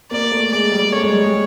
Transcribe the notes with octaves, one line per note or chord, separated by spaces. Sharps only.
A#3 D5
A3
G#3 D5
G3
A3 C#5
G#3
G3
G#3